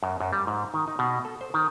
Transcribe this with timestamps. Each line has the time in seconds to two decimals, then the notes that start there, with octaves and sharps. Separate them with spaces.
0.03 F#2
0.20 F#2
0.33 G3
0.47 G#2
0.74 D#3
0.88 D#4
0.99 B2
1.25 A4
1.41 C5
1.54 D#3